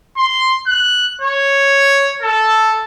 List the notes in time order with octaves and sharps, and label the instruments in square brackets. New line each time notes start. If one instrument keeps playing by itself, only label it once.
[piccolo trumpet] C6
F#6
C#5
A4